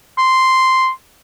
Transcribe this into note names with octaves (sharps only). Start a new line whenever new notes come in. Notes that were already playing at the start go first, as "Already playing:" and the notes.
C6